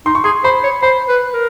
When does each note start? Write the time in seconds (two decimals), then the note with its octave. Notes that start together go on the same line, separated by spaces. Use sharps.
0.06 D#4 C6
0.15 C#6
0.24 G#4 C6
0.44 C5 B5
0.64 C#5
0.82 C5 B5
1.09 B4
1.34 A#4